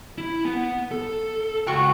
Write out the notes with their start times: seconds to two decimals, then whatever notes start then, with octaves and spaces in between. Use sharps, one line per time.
0.18 E4
0.45 B3
0.91 A4
1.67 C#2 F#4 G5 C#6